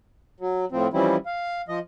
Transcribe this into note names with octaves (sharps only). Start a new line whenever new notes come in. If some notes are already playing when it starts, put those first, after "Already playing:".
F#3
A2 F3 C4
E3 F3 G3 C4 C#4 E4
F5
F3 D#5